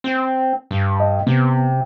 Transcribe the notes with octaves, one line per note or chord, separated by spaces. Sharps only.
C4
G2
D#5
C3 B3